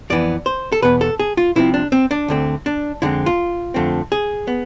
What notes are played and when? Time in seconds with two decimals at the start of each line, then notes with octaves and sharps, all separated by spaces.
0.10 F2 E3 B3 D5
0.46 C5
0.72 A4
0.82 E2 B2 B3 B4
1.01 A4
1.20 G#4
1.37 F4
1.56 C2 C3 F3 A3 C4 E4
1.74 D4
1.92 C4
2.11 D4
2.28 D2 D3 A3 C4
2.66 D4
3.02 F2 D3 G#3 C4 E4
3.26 F4
3.74 F2 D3 F3 A3 C4
4.12 G#4
4.48 B3